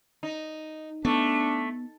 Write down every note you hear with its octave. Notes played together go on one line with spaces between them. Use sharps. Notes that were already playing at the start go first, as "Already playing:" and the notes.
D#4
A3 B3 D4